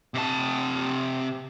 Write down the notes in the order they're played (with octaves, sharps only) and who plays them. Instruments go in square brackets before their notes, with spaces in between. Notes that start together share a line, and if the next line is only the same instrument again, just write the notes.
[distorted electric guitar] C3 A5